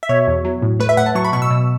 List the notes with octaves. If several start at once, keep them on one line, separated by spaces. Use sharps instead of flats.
E5
B2 C#5
E2
F#3
A2
A3 B4
E5
A2 F#5
A5
F#3 C#6
B5
B2 C#6
E6
B2